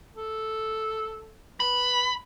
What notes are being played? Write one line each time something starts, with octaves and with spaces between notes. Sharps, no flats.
A4
B4 B5